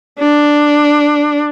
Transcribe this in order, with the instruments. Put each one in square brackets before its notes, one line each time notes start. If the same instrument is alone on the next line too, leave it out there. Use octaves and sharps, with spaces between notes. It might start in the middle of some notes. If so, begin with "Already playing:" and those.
[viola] D4